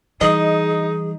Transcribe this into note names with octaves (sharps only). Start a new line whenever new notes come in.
E3 G3 D#4 G#4 D#5